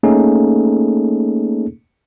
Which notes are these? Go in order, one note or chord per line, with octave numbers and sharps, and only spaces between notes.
A3 A#3 C#4 D#4 G#4 A4